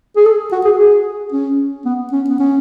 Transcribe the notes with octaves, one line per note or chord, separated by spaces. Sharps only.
G#4
A4
F#4
G#4
G#4
C#4
B3
C#4
B3
C#4